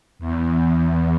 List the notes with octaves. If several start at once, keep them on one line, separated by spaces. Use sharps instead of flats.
E2